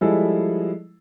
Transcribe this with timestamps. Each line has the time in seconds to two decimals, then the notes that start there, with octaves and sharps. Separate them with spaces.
0.01 F3 G3 G#3 E4 G#4 A4